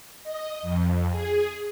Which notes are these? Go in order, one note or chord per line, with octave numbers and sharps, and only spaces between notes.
D#5
F2
G#4